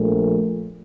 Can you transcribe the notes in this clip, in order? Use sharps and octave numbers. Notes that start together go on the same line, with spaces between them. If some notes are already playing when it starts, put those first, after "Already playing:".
Already playing: A#1 A#2 A3